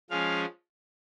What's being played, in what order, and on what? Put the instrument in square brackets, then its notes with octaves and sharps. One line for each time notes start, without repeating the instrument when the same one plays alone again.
[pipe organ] F3 G#3 C#4 F5